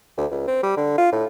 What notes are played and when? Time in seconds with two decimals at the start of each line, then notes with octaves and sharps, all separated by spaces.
0.17 D2
0.31 C#2
0.47 C4
0.63 G3
0.77 D3
0.98 F4
1.12 A2